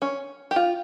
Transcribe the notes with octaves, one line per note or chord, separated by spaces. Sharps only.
C#4
G4
F4